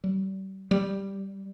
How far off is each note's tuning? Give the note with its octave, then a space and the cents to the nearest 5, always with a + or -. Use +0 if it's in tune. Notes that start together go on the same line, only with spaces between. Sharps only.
G3 -35
G3 -5